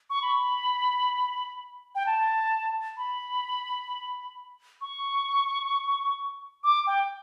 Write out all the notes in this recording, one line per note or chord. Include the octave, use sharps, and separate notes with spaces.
C#6
B5
G5
A5
B5
C#6
D6
G5